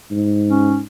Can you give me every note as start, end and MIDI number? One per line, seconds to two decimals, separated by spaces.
0.11 0.82 44
0.51 0.79 61